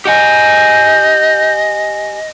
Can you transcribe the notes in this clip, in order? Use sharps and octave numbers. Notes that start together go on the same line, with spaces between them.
G4 D#5 F#5 G#5 G6